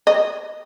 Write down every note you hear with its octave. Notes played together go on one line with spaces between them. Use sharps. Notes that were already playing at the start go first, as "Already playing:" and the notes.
D#5